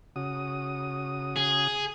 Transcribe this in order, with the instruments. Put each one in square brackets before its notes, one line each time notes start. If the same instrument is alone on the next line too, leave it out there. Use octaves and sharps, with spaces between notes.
[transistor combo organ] C#3 F#4 D#6
[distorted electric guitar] G#4